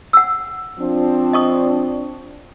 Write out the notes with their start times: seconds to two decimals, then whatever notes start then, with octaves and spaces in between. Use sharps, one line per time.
0.13 F#5 E6
0.80 F3 C4 D4
1.33 D#5 C#6 D#6